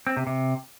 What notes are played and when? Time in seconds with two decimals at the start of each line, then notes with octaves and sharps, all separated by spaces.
0.07 C4
0.17 C3
0.27 C3